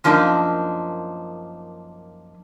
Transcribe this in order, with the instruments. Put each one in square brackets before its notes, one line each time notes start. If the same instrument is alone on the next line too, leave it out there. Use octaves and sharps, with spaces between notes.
[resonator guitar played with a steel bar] F#2 F3 A#3 D4 D#4